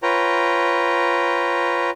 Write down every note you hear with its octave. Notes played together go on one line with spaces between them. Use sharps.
F4 B4 C#5 G5 A#5